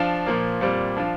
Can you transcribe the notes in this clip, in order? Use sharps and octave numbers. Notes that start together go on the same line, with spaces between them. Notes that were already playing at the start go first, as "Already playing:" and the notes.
Already playing: F3 D4 F4
A#2 F3 A#3
A#2 G3 C4
F3 D4 F4